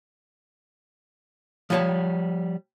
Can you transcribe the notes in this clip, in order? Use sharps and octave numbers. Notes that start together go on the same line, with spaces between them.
F3 G3 C#5 G#5 A5